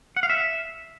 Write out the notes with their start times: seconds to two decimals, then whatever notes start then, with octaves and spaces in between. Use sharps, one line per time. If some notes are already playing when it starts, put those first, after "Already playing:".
0.17 F#5
0.23 F5
0.30 E5